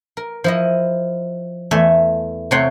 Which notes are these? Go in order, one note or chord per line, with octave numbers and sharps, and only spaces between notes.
A#4
F3 E4 D#5
E2 A3 E5 G#5
C3 A3 C4 C#5 F#5 C6